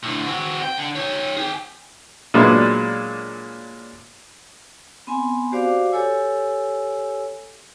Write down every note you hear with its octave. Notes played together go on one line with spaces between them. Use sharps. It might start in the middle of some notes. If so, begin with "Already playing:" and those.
A2 D3
C4 F#4
G5
D3
D#4 C#5
G#4 G5
A#2 F#3 G#3 B3 D4 D#4
B3 C4 G#5
F#4 G4 C5 D5 F5 D6
G4 A4 C#5 G#5 E6